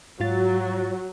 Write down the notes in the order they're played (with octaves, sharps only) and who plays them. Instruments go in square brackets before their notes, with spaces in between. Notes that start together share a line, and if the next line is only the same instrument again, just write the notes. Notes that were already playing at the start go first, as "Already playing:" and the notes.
[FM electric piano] G#2 F4 A6 [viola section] F#3